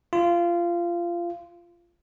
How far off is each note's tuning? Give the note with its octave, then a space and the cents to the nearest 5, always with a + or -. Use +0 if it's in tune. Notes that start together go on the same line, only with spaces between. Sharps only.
F4 -20